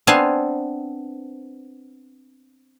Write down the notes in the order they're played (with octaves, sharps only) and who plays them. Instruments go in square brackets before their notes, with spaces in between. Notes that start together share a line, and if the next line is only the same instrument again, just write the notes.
[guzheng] B3 C4 D4 F5 G#5 A5